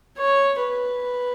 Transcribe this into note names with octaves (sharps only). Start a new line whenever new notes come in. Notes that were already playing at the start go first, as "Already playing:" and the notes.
C#5
B4